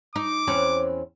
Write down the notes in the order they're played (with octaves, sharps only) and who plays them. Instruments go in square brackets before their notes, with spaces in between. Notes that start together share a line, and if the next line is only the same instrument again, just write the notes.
[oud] D#4 [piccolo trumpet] D6
[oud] E2 C4 C#4